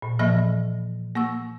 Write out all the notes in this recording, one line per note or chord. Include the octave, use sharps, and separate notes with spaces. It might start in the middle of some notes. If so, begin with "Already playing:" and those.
A#2
A#2 E3 F3 A#3 E5 A#6
A#3 F#5 C#6 E6